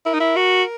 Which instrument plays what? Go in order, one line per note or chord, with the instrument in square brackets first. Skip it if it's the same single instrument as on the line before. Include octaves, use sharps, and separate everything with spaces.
[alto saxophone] E4 [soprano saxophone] A#4
[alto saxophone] D#4
E4
F#4